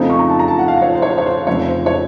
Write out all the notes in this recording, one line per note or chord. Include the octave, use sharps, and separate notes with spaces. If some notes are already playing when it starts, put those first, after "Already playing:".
Already playing: F2 C#3 A3 C4 D#4
C#6
A#5
A5
A#5
A5
F#5
F5
C#5
C5
C#5
C5
C#5
C5
F1 F2 C#3 A3 C#5
C5
C#5